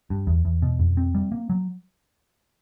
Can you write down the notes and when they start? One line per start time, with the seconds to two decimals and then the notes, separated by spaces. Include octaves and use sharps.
0.10 G2
0.27 E2
0.45 E2
0.62 B2
0.79 F2
0.97 C4
1.15 G3
1.32 A#3
1.50 F#3